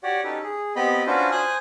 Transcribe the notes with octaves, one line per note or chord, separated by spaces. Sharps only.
F#4 G4 C#5 D5 F#5
C#4 D#4 G4 A4 B4
G#4
B3 C4 G4 D#5 B5
C#4 D4 F4 F#4 B4 C5
C5 G#5 D#6 F#6